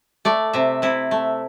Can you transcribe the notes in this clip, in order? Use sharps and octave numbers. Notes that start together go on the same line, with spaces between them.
A3 D5
C3 E5
C3 E4
A3